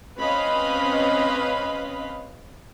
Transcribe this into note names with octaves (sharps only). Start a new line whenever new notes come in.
C4 C#4 B4 D#5 F5 B5